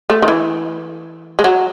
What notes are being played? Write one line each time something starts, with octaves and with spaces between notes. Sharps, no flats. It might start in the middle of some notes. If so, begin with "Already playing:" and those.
A3
D#3
E3
G#3
F#3